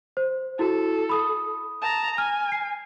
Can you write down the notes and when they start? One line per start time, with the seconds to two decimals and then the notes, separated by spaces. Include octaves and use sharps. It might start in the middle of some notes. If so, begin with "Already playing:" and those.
0.17 C5
0.59 E4 F#4 A4
1.09 B5 D#6
1.82 A5 A#5
2.18 G#5 F6
2.52 C7